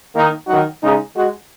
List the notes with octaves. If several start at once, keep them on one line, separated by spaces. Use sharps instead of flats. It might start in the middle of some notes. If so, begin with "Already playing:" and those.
D#3 A#3 D#4
D#3 F#3 D#4 F#4
C#3 G#3 D#4 G#4
G#3 F#4